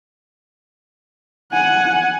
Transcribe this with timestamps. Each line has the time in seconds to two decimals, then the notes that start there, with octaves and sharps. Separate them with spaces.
1.52 F#5 G#5